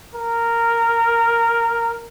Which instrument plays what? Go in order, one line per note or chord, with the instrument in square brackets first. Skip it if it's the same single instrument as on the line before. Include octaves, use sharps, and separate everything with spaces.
[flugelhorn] A#4